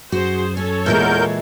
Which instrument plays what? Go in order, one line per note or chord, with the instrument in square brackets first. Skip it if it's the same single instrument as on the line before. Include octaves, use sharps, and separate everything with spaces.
[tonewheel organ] F#2 [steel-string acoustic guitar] F#4 [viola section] G#4 C5
[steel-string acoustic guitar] C#4 [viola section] A4 C#5
[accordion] E2 A#4 G6 [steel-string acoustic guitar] A#2 E3 G#3